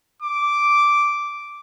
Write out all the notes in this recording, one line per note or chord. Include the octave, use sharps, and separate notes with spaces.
D6